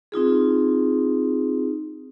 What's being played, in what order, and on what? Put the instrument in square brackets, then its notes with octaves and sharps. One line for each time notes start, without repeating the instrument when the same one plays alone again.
[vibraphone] C4 D#4 F4 G#4